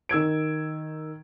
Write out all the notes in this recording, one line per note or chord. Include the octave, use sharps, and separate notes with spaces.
D#3 E6 G#6 D7